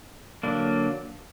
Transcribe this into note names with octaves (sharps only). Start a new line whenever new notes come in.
D3 F#3 A#3 D4